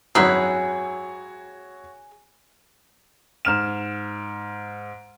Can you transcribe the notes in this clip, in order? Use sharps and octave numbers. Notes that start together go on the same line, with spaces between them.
G#1 F#2 D#4 E4 F#4 G#4 B4 C#5
G#2 F6 E7